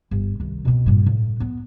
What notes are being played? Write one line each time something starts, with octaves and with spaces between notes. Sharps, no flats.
G1
C2 D#3
B2 C4
G2 A#2
A2
B3